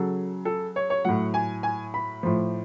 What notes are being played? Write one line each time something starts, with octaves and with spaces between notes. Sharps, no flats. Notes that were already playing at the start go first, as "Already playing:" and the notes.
Already playing: C#3 F#3 A4
A4
C#5
C#5
A2 F#3 F#5
G#5
G#5
B5
A2 F3